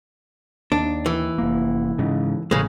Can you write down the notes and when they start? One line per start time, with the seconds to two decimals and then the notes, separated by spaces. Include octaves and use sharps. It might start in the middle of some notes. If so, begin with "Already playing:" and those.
0.72 D#2 D4
1.06 E3
1.38 F1 A#3
1.98 G#2 C#3
2.51 A1 C#3 G#3